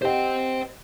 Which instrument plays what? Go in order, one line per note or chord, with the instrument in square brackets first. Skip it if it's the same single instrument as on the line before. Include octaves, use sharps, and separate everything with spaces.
[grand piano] G4 D#5 F#5 [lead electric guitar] C5 G5